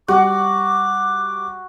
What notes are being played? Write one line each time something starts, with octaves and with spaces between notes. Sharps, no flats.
G3 F#4 D6